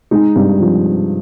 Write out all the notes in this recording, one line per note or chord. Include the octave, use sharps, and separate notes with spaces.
G#3 D#4
G2
F3